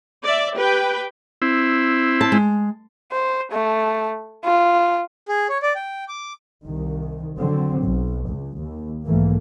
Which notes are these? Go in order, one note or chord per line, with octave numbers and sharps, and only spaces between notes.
D5 E5
G4 B4 G5
C4 E4
A5
G#3
C5
A3
F4
G#4
C#5
D5
G5
D6
C2 D#3
D3 F#3 C4
B1
C#2
D#2
B1 G#2 E3 A3 A#3